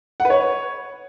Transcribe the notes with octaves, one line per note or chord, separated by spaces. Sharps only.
F#5
B4
C#5